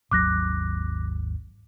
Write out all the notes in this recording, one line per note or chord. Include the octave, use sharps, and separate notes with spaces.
G#1 D#2 F#3 D6 F#6 A#6